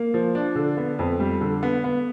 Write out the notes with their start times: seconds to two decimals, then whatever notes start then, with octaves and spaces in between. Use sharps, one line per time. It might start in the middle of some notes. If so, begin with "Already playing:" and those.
Already playing: A#3
0.14 F3
0.35 D4
0.55 D3
0.77 B3
0.99 F2
1.20 G3
1.41 D3
1.63 B3
1.84 B3